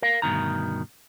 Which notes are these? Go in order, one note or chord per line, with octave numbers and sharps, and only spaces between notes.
A#4 F5
D2 G2 B2 D#3 A#5